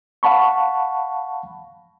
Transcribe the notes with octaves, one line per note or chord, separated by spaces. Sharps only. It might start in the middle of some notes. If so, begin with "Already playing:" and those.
F5 F#5 A5 B5 C#6